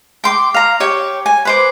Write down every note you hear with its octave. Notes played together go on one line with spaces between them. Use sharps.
G5 C6 D6
F5 A#5
G4 C#5 G5
G#5
B4 C5 D6